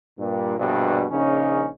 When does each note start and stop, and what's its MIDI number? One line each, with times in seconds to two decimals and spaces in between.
0.19 0.55 43
0.19 0.55 46
0.58 1.04 34
0.58 1.04 43
0.58 1.04 47
1.10 1.66 34
1.10 1.66 49
1.10 1.66 61
1.10 1.66 63